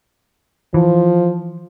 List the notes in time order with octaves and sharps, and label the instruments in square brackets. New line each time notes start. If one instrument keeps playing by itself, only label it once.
[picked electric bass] E3 [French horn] F3